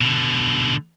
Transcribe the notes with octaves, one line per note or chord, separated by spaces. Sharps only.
B2 D3